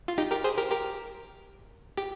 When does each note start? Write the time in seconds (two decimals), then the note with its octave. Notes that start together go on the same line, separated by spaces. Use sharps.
0.08 F4
0.18 D#4 G4
0.31 G4 A#4
0.44 G#4 C5
0.58 G4 A#4
0.71 G4 A#4
1.98 G4